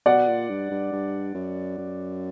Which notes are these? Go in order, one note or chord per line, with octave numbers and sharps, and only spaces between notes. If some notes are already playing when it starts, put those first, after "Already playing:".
B2 D5 F#5
A#2
G2
G2
G2
F#2
F#2